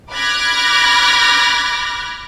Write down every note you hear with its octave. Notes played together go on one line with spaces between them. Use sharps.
B5 D6 F6 F#6 G#6 A#6